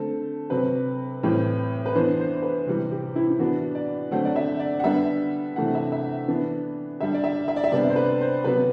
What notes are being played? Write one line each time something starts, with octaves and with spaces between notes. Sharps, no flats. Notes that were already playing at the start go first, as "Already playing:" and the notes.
Already playing: D3 A3 C4 A4
C3 F#3 C4 B4
A2 E3 G3 C4
B4
E3 B3 D4 C5
C5
C5
B4
C3 E3 G3 C4
G4
E4
E4
E3 B3 D4 F#4
D5
D3 F#3 A3 C4 F#5
D5
E5
D5
F#5
D3 G3 B3 D4 E5
C3 E3 A3 D4 F#5
E5
E5
E3 B3 D4
D3 G3 D4 E5
D5
E5
E5
D5
E5
C3 G3 B3 D4 D5
C5
B4
C5
C3 F#3 B3 B4